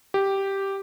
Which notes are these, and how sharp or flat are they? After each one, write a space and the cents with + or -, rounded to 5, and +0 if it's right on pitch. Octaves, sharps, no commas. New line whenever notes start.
G4 -5